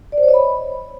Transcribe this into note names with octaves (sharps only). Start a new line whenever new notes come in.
D5
C5
C#5
D#5
B5